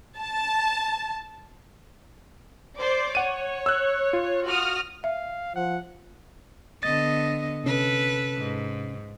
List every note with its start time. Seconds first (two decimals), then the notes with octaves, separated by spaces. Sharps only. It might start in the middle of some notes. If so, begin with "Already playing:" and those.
0.18 A5
2.78 C5 D5 D6
3.15 C#5 F#5 D#7
3.66 E6 F#6
4.13 F4
4.47 F#4 D#6 F6
5.04 E5 F5
5.56 F3 F#5
6.83 D3 B3 D#5 A6
7.64 C3 C#4 A4 B4
8.38 G#2